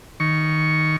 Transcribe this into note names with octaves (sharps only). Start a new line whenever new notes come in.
D#3 C#6